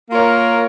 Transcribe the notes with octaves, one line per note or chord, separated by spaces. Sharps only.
A#3 F4 A#4 C#5